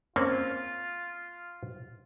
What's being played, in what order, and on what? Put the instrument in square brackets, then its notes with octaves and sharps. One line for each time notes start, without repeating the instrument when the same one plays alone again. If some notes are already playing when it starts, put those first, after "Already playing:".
[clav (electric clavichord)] A#3 C4 C#4 [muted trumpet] F4